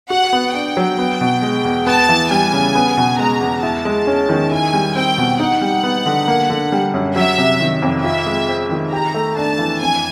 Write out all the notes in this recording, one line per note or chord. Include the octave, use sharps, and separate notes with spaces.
F#4 F#5
B3
D4 G5
F#3
B3
B2
G#3
E2
B3 A5
E3
G3 G#5
C#3
B3
B2
G#3 A#5
E2
E4 A5
G#3
C#4
D#3
E4 G#5
G3
C4 G5
B2
D#4 F#5
G3
B3
D3
A#3
D3
G3
F#2
F#3 E5
C3
D#3
F2
F4 E5
G#3
C4
D#3
G4 A#5
A3
D4 A5
E3
F2 G#5